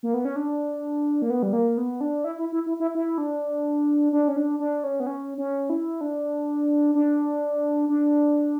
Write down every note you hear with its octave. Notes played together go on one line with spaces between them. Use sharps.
A#3
B3
C#4
D4
A#3
B3
G3
A#3
B3
D4
E4
E4
E4
E4
E4
E4
D4
D4
C#4
D4
D4
C#4
B3
C#4
C#4
E4
D4
D4
D4